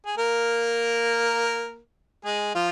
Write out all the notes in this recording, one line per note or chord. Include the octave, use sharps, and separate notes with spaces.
G#4
A#3 A#4
G#3 G#4
F3 F4